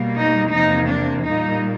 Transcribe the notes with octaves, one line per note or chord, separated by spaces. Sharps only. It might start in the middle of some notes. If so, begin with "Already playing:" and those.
Already playing: B2 G3 A#3
D#4
E2 C3 F3 A#3 D#4
D4
A#2 G3 A#3 D#4